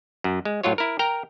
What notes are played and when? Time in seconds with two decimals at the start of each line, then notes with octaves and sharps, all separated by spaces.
0.24 F#2
0.45 G#3
0.64 A2 F#3 F4 C#5
0.78 E4 A#4
0.99 A#4 G5 A#5